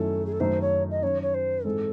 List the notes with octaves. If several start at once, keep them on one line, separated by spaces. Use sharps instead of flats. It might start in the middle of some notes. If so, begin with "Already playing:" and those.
Already playing: F#2 D#3 A3 C#4 E4 A4
G#4
A4
F#2 D#3 A3 D#4 C5
C#5
D#5
D#3 F#3 C#4 C#5
C#5
C5
G#2 E3 G#3 C4 A4